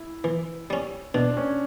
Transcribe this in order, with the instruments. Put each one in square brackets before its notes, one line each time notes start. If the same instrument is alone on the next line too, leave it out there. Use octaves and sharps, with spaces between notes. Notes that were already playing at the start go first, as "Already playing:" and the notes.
Already playing: [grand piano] E4
[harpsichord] E3
G3 C#4
[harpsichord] B2 [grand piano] D4
[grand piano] C#4